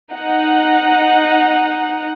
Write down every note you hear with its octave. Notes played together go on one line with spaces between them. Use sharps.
D#4 F#5